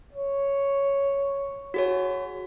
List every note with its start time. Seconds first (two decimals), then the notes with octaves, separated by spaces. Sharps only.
0.13 C#5
1.74 F#4 G#4 C#5